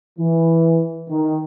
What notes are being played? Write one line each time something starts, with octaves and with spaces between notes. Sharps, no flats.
E3
D#3